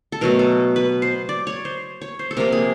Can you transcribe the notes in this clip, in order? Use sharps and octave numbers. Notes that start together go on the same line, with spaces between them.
A4
B2 F#3 A3 A#4
A4
B4
C5
D5
C#5
C5
C#5
C5
A4
C3 F3 A#3 A#4
G#4